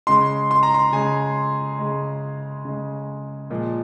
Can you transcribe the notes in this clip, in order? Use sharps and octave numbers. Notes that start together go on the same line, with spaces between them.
C#3 G#3 C6
C6
A#5
C6
C#3 G#3 G#5
C#3 G#3
C#3 G#3
A#2 F3 G#3